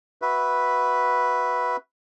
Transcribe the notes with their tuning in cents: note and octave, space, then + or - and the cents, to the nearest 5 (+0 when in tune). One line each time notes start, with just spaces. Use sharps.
F#4 +0 B4 +0 E5 -5